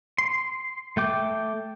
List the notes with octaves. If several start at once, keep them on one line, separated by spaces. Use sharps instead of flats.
C6
A3 G5 D6